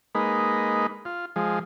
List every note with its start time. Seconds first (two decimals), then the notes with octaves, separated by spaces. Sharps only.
0.15 G#3 A#3 D#4 B4
1.05 F4
1.36 F3 G#3